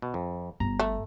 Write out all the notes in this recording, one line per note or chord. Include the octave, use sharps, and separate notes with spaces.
B2
F2
G1 A#5
A3